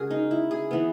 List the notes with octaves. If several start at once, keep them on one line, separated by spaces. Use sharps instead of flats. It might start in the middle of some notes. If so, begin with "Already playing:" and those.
Already playing: C#3 G#3 B3 F#4 G#4 A#4
D#4
E4
G#4
E3 B3